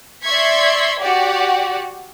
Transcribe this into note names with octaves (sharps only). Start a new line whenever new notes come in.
D5 E5 C6 C#6 G#6 B6
F#4 G4 D5 F#5